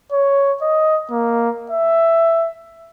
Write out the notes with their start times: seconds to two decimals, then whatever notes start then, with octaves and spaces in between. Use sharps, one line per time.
0.12 C#5
0.62 D#5
1.11 A#3
1.71 E5